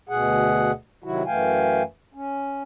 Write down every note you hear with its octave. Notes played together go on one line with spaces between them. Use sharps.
D2 B2 G#4 F#5
C3 D#3 F#3 E4 F#4
F#2 E3 A3 F5 G5 G#5
C#4